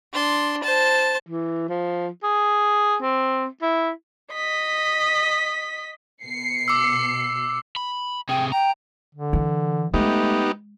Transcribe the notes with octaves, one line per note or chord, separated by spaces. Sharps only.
D4 C6
C5 A5
E3
F3
G#4
C4
E4
D#5 B6
B2 C7 C#7
D6 E6
B5
C3 G#4 G5
G5 A#5
D3
E3
G#3 A3 B3 D#4 G4